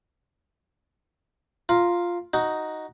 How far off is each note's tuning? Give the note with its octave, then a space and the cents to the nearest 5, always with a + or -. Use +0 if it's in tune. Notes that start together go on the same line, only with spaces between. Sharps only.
F4 +0 A#4 +0
D#4 +0 F#4 +0